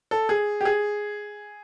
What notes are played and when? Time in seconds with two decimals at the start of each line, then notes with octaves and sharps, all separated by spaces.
0.11 A4
0.29 G#4
0.61 G4
0.65 G#4